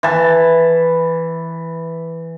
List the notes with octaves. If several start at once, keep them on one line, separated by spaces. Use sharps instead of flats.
E3 A5